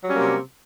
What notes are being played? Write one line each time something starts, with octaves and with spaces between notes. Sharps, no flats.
C3 F#3 G3 A#3 C#4